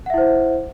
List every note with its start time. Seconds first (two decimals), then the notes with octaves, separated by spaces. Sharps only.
0.06 F#5
0.10 E5
0.14 E4
0.18 C5